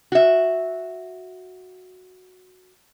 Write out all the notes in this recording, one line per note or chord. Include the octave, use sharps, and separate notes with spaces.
F#4 E5